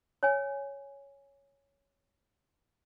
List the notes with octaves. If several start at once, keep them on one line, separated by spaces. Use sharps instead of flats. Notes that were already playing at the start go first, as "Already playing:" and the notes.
C#5 G#5